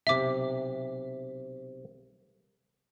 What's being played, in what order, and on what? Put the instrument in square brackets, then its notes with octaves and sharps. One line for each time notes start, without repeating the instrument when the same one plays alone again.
[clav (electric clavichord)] B1 C3 [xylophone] E5 D6